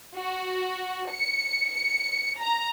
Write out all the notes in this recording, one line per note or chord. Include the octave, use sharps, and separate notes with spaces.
F#4
C#7
C#7
A#5